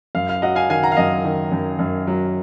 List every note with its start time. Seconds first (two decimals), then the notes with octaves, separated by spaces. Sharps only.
0.15 F#2 F5
0.29 F5
0.42 F#3 D#5 F#5
0.56 F5 G#5
0.70 D#3 F5 G#5
0.83 F#5 A#5
0.92 F5
0.97 F#2 D#5
1.25 D#3
1.52 F#2
1.79 F#2
2.07 F#3